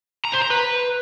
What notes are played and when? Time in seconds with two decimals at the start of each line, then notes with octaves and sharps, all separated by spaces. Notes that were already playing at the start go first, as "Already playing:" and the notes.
0.25 A#5
0.33 C5
0.42 A#5
0.50 B4